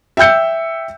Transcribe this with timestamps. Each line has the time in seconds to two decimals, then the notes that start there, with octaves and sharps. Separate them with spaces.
0.17 E5 G5 E6 G6 C#7